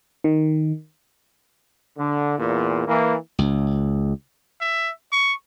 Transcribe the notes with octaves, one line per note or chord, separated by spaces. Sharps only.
D#3
D3
E2 A#2
E3 A#3
C#2
E5
C#6